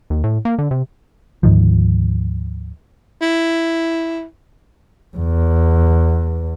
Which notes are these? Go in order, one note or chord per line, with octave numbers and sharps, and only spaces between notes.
D#2
A2
A#3
D3
C3
D2 G#2 D#3 F3
E4
E2